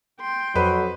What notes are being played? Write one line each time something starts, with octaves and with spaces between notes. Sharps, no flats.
G5 C6
F2 F#3 B4